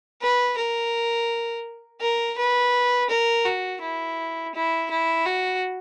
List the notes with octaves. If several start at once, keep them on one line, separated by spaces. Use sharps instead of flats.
B4
A#4
A#4
B4
A#4
F#4
E4
E4
E4
F#4